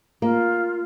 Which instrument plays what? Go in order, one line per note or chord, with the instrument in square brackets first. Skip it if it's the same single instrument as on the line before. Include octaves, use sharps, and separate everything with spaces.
[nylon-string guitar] A#3 [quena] F4